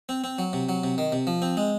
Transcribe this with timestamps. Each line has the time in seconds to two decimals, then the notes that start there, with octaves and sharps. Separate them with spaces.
0.09 C4
0.24 C4
0.38 F#3
0.53 C3
0.69 F#3
0.84 C3
0.98 D#3
1.12 C3
1.27 F3
1.42 C4
1.57 G#3